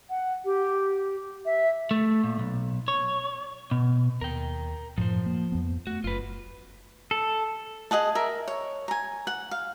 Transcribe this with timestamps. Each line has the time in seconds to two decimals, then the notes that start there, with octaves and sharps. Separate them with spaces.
0.10 F#5
0.45 G4
1.45 E5
1.91 A3
2.24 A#2
2.39 B1
2.88 C#5
3.71 B2
4.21 D#2 A#4 G5
4.98 F#2 A2 F3 C5
5.26 A#3
5.52 F2 B3
5.87 A3 F#4
6.04 F#1 F4 B4
7.11 A4
7.91 G#4 D#5 F#5 A5
8.15 A#4 E5
8.48 C#5
8.88 G#5 A#5
9.27 F#5
9.51 F5